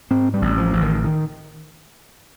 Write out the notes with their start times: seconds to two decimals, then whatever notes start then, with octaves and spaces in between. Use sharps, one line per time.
0.11 G#2 C4
0.34 G3
0.42 A1
0.58 F3
0.73 A1
0.81 D#3
1.04 D#3